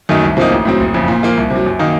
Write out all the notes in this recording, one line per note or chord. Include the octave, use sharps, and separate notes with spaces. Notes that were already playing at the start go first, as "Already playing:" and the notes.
F#2 D#3 A3 D#4
C2
C3 F3 A#3 D#4
A1
A2 F#3 C4
F#1
F2 C#3
A#2
F3 A#3 F4
C2
C3
F#3
F#2
D#3 A#3 D#4